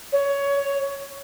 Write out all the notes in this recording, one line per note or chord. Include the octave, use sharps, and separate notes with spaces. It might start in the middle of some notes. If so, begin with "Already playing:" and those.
C#5